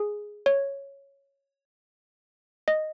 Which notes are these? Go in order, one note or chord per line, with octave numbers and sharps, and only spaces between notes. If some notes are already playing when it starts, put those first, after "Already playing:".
Already playing: G#4
C#5
D#5